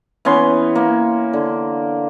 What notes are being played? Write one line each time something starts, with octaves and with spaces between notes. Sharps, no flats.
E3 B3 C#4 C6
A#3
D3